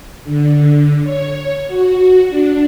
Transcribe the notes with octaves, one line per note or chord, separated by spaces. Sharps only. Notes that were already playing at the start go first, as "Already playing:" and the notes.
D3
C#5
F#4
D4